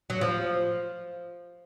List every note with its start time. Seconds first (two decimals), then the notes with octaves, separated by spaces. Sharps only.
0.10 F#3
0.21 F3